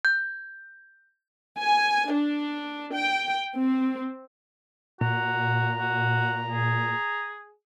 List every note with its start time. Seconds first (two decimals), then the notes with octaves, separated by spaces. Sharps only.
0.05 G6
1.59 G#5
2.11 D4
2.94 G5
3.56 C4
5.01 A#2 F#4 A#5
5.78 F#4
6.50 G#4